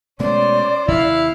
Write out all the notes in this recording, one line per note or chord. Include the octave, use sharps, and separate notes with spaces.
B2 G#3 A3 C#4 C5 D5
D#2 C3 E4 F5